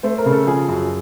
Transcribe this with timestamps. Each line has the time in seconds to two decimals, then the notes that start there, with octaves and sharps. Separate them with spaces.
0.03 A3 C5
0.18 A#4
0.26 C#3
0.32 A4
0.47 F3 G#4
0.68 F#2